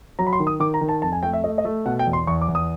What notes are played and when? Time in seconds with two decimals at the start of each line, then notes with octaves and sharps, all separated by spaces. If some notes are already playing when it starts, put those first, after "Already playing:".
0.19 F#3 A#5
0.27 B5
0.33 C6
0.40 D#3
0.47 D#6
0.60 D#3 D6
0.74 A#5
0.81 D#3
0.89 A5
1.02 F2 A5
1.12 G#5
1.23 A3 G5
1.33 E5
1.44 A3 D#5
1.58 D#5
1.65 A3
1.86 B2 F#5
1.99 G5
2.06 E2
2.13 C6
2.27 E2 C#6
2.42 D6
2.48 E2
2.55 D#6